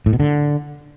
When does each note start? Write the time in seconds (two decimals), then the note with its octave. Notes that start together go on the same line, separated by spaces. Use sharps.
0.06 A2
0.13 B2
0.20 D3